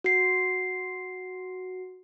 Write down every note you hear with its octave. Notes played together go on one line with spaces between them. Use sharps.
F#4 C7